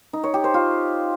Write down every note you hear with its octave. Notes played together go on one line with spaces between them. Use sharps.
D#4
C#5
G4
C5
F4